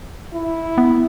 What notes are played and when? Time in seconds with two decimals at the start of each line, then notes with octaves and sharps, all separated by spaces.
0.34 E4
0.78 B3